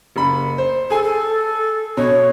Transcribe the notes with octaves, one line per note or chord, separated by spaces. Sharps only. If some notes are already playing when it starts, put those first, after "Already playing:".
F#1 B5
C5
G#4 A4 G#5
A4
B2 C#5